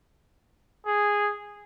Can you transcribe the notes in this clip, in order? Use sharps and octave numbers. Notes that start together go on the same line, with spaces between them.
G#4